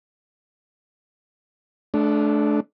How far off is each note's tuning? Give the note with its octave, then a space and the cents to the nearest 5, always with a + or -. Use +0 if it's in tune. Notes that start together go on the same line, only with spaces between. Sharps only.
A3 -30 D4 +0